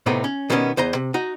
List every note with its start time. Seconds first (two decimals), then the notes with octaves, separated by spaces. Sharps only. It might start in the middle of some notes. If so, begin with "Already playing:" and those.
0.06 A2 C3 A3 B3 C4 D#4
0.24 C#4
0.50 B2 D#3 G3 A#3 B3 C#4
0.77 E2 C5 D#5 A#5
0.95 C3
1.14 D#4 F#4